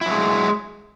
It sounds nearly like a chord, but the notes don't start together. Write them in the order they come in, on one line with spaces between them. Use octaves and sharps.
E4 F#3 G#3